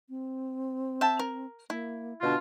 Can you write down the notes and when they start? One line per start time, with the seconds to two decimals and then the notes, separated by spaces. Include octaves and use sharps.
0.09 C4
1.01 E5 G5 A5
1.19 A#4
1.70 A#3 E4
2.21 B2 D3 D4 F4